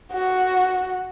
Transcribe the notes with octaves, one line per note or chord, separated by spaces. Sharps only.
F#4